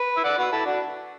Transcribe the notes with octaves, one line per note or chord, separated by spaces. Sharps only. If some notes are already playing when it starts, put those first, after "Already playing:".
Already playing: B4
E5
D5 F#5
F#4 B4
E4 A4
D4 F#4